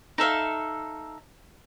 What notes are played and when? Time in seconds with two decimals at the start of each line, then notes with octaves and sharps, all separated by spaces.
0.18 D#4 A4 E5 F5